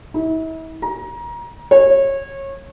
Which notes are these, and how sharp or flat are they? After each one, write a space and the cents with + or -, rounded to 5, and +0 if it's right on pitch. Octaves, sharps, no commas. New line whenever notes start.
E4 -40
A#5 +25
C#5 -25